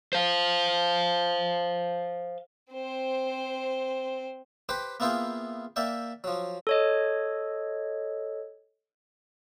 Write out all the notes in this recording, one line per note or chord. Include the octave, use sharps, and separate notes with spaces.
C5 F5
C4 C5
G4 B4 C5 G5 D6
A#3 B3 E4 F4 G#4 G5
A#3 D5 E5 G5
F3 F#3
A4 C#5 D#5